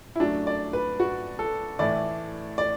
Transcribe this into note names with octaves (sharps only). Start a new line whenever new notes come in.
E4
F#2 F#3 A3 D4
D5
B4
F#4
A4
A2 E3 A3 D5
D5